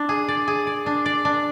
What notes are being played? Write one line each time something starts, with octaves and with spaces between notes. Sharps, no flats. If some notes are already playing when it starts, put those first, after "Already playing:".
Already playing: D4 D5
G#4
D5
G#4
D5
D4
D5
D4